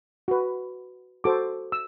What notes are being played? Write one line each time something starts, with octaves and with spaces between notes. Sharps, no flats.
F#4 B4
F#4 A4 C5 D6
E6